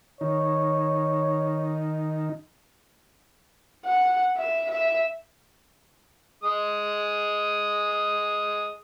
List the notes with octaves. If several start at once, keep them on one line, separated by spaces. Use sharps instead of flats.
D#3 D#4 C#5
F#5
E5
E5
G#3 D#6